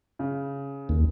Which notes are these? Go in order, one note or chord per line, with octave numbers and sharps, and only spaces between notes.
C#3
D#2